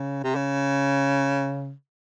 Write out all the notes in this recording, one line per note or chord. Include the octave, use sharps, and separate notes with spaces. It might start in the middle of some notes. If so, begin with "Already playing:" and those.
Already playing: C#3
C3
C#3